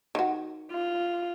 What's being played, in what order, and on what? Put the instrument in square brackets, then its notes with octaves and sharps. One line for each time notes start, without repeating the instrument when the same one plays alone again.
[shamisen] D#3 F#4
[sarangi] F4